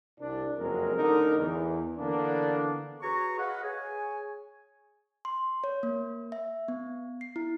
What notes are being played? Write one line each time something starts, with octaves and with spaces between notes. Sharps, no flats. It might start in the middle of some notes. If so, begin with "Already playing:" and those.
C2 D4
F#1 F2 F#3 G#3 A#4
A1 D3 D#4 A#4
E2
D3 E3 A#3 B3 D4
F#4 G#4 B4 C#5 A#5 C#6
B4 D#5 F5 F#5
G#4 C#5 G#5
C6
C#5
A#3
E5
B3
C7
E4